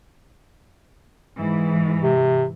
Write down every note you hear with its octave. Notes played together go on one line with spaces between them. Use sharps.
G#2 E3
C3